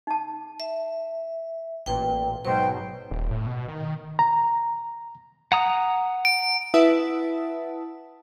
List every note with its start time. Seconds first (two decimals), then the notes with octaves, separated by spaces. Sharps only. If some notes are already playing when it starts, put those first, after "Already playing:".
0.07 D#4 A5
0.60 E5
1.86 A1 A#2 B4 G5
2.45 G#2 B2 F#3 B4 C5 G5
3.11 D#1
3.31 A2
3.46 B2
3.68 D#3
4.19 A#5
5.52 F#5 A#5 D#6
6.25 D7
6.74 E4 B4 E5 F#5 A5 D#6